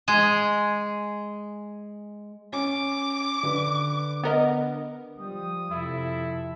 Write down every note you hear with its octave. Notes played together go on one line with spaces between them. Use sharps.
G#3 G#4
C#4 D6
D3 B4
B3 A#4 D#5
F3 G3 D#6
F2 C3 E4 A4